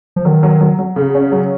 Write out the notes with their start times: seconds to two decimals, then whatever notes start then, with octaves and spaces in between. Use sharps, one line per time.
0.16 F3
0.25 D#3 F#3
0.43 F#3
0.61 F#3
0.79 F#3
0.96 C#3
1.15 C#4
1.32 F#3